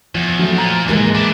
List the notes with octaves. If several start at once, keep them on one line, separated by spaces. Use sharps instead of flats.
E2 F3
F#3 A3
A#2 A#5
D#2 G#2 E3 G#3 A#4
D4 E4 D6